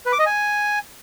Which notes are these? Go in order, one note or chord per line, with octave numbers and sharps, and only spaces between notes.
B4
D6
D#5
G#5